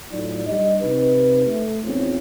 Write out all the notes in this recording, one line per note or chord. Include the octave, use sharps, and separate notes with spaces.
A2 F#3 D#4 F4 D5
G3 D4 G4 D#5
C3 D#4 B4
A3
E2 C4 C#4 D#4 F4 C#5